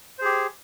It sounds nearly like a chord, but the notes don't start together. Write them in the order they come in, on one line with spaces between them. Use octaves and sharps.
C5 G#4 G4